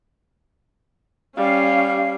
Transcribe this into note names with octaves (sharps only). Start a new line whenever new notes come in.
G3 C#4 F5